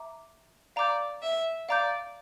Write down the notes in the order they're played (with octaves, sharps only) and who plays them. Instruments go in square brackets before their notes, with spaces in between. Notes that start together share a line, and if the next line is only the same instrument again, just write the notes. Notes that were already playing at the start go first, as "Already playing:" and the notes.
Already playing: [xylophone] E5 A#5 D6
[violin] D5 [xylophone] F5 A#5 D6 G6
[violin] E5
[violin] D5 [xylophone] F5 A#5 D6 G6